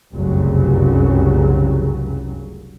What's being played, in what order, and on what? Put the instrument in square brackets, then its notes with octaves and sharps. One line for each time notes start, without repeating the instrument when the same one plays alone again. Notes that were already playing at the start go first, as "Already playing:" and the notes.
[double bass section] F1 C2 F#2 C#3 F#3